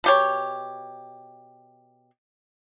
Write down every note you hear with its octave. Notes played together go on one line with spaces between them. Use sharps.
B2 G4 C#5